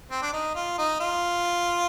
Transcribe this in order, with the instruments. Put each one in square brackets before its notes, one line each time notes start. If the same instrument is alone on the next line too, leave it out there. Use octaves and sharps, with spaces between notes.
[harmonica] C4
D4
D#4
F4
D#4
F4